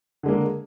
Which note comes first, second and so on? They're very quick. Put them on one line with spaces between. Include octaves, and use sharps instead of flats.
D3 G#3 A#3